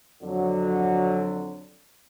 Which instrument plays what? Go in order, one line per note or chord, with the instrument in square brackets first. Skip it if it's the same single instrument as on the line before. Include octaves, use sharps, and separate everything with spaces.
[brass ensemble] F2 D3 F#3